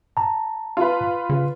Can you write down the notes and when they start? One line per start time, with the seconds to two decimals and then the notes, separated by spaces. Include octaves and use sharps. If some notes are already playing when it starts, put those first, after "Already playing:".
0.17 A5 A#5
0.77 F4 B4
1.30 C#3